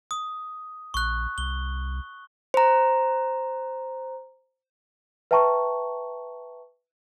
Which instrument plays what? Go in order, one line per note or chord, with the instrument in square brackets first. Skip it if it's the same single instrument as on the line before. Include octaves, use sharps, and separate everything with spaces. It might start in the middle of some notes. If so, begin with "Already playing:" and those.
[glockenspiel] D#6
[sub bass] A#1 [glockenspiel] C#6 F#6
[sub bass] C2 [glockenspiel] G7
[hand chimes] C5 A#5
[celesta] B4 E5 G5 A5 A#5 C#6